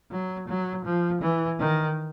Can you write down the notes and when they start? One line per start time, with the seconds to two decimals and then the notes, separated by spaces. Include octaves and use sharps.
0.11 F#3
0.47 F#3
0.84 F3
1.21 E3
1.59 D#3